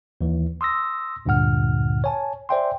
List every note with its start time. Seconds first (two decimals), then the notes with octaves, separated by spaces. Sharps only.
0.21 D#2 E3
0.61 C6 D#6 E6 A#6
1.26 D2 G2 A#2 D3 F#5 F6
2.04 C#5 G#5 A5
2.49 C5 D5 E5 G5 G#5 C6